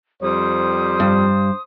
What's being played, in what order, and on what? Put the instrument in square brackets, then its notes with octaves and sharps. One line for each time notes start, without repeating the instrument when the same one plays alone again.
[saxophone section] F2 G3 [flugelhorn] C5 [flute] D#6
[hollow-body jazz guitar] G2